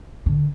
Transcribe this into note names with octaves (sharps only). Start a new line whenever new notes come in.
D3